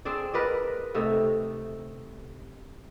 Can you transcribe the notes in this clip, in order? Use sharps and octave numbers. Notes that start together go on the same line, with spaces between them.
C4 D4 G#4 D5
A#4 B4 D5 D#5
C3 A3 D#4